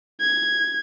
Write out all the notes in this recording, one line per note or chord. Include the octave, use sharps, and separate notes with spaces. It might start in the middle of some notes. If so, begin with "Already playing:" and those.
G#6